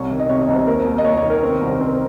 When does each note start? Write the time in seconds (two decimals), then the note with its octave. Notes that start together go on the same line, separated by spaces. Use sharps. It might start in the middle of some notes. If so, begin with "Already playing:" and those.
Already playing: C2 C#5
0.10 D#3
0.20 D#5
0.29 C3 C#5
0.42 D#5
0.48 C2
0.54 C5
0.67 D#2 A#4
0.86 D#2
0.98 D#5
1.05 D#2 C#5
1.17 C#5
1.24 D#3
1.30 A#4
1.43 C4
1.62 C2
1.80 C4